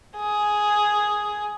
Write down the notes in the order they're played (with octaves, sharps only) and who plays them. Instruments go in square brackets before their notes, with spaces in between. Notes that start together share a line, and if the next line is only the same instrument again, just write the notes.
[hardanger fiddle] G#4